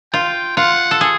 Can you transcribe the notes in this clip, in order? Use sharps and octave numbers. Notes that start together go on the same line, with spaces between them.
F4 G5
F4 F#5
A4
G#4